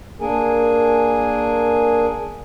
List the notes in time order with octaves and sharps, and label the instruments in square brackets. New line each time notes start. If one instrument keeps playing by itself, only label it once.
[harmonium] A#3 D4 G#4 A#4 G#5